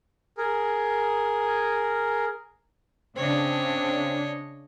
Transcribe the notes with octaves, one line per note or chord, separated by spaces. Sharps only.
G#4 A#4
C#3 C4 D4 C#5 D#5